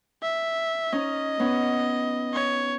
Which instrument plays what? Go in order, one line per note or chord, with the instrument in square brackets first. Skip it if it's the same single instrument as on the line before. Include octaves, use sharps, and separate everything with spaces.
[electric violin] E5
[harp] C#4 D#4 [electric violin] D#5
[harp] B3 C#4
[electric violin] C#5